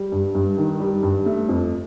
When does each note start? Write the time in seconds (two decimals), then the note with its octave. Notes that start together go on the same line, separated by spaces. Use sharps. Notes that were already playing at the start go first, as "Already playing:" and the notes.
Already playing: G3
0.12 G2
0.35 G2
0.58 D#3
0.80 G3
1.03 G2
1.26 A3
1.49 F2